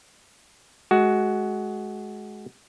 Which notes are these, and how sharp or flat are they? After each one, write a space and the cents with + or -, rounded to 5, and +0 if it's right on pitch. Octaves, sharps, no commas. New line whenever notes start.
G#3 +25 F#4 +10